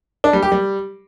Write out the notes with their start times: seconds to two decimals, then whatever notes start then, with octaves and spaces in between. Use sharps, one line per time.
0.24 D4
0.33 G3
0.42 G4
0.52 G3